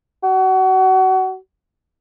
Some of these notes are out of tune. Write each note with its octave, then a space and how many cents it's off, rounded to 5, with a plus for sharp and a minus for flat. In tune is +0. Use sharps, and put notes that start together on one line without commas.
F#4 +30